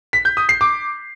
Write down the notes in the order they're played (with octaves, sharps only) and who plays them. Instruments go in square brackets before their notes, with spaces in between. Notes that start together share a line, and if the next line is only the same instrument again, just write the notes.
[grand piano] B6
G6
D#6
C7
D6